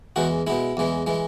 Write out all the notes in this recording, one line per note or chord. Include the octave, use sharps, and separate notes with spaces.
E2 E3 G#3 F#4
B2 G#3 E4
E2 E3 G#3
E3 G#3